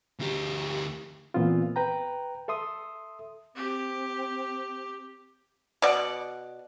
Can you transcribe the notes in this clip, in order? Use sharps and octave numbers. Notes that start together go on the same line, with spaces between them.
D2 G4
A#2 E3 B3 C4 F4
B4 G5 A#5
A4 E5 C6 D#6
C4 G4
B2 D5 F#5